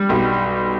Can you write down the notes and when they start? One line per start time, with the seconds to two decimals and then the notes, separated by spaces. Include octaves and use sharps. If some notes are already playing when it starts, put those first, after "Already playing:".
Already playing: G3
0.09 B1